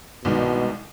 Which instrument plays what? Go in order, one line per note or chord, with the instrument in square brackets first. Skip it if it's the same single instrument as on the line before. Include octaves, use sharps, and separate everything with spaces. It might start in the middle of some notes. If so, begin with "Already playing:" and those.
[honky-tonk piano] C2 G#2 D#3 [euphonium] B2